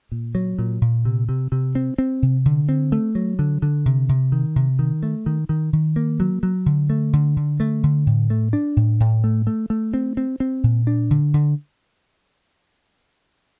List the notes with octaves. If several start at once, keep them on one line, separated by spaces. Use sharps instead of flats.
A#2
F#3
A#2
A#2
C3
C3
C3
C4
C4
C3
D3
C4
A3
F#3
D3
D3
C3
C3
D#3
C3
D#3
A3
D#3
D#3
D#3
A#3
F#3
F#3
D3
A3
D3
D3
A3
D3
A2
A3
D4
A2
A2
A3
A3
A3
C4
C4
C4
A#2
D4
D3
D3